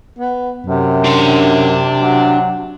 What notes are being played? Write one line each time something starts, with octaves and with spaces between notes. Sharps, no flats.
B3
F#2 C3
D4 C6
F#3